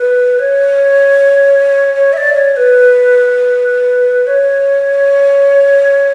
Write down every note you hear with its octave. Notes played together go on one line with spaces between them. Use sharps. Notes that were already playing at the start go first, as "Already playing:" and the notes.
Already playing: B4
C#5
C#5
E5
D5
C#5
C#5
B4
C#5